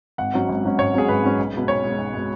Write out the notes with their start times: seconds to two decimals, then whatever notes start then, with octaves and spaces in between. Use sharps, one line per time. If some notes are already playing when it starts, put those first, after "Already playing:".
0.18 G#1 F#5
0.33 G#2 F#3 C#4
0.49 G#1
0.63 G#2 F#3 C#4
0.78 G#1 C#5
0.94 G#2 F#3 C#4 G#4
1.08 G#1 B4
1.23 G#2 F#3 C#4
1.38 B1
1.53 B2 G#3
1.68 B1 C#5
1.84 B2 G#3
1.98 B1
2.14 B2 G#3